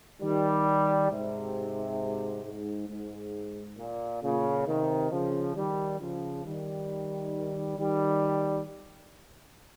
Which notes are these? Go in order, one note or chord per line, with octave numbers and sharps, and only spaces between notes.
D#3 G3
G#2 C3
G#2
G#2
A#2
A#2 C#3
C3 D#3
C#3 F3
D#3 G3
C#3 F3
D#3 G3
D#3 G3